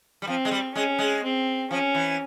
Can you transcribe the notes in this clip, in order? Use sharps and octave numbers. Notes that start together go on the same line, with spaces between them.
G3
F3 C4
G#3
G3
G#3 C#4
G#3
C4
F3 C#4
E3